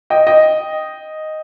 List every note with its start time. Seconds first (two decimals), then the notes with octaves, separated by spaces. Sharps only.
0.10 D#5 G5
0.27 D#5 G5